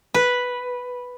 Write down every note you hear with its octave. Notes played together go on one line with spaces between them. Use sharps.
B4